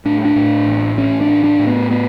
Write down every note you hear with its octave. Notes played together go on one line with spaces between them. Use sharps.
A2 D4
D4
A2
A1
A1 C#4
D4
A2
D4
A2
B3
B3